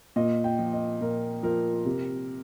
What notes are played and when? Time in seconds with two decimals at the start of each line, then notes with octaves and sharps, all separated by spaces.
0.16 A#2 D#5
0.44 G5
0.59 F3
0.73 D#5
1.01 A#2 A#4
1.43 F3 A#4
1.86 C3